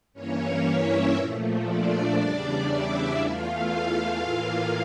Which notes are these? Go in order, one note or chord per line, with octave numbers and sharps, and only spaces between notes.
G2 E3 A#3 C#4 C#5
E4 E5
A#2 F3 A3
D4 D5
E2 C#3 G3
E4 E5
E2 E3 A3 F4 F5
A2 E3 A#3